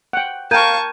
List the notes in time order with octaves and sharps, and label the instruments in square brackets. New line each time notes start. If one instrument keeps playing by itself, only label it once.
[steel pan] F#5 G5
[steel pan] A#4 G5 [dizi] F5 [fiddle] A5 C#6 [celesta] G6 G#6 D#7